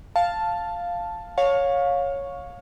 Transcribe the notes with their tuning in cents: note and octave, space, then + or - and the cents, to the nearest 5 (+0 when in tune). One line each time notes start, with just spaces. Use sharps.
F5 +0 A5 +0
C#5 +0 F5 +25